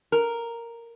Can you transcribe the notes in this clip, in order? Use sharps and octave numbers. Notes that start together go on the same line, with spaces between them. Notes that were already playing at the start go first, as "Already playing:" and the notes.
A#4